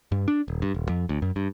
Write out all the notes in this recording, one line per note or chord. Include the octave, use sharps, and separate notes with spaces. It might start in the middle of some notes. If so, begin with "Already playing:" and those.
G2
D4
D#1
G2
D#1
F2
D2
F#2
G2